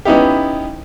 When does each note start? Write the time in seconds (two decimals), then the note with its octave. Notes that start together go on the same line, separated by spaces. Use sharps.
0.05 B3 C#4 D#4 E4 G4